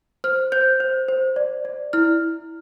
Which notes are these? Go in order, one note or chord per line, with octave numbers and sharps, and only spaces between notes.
C5 F6
C5 G6
C5
C5
D5
D5
E4 F6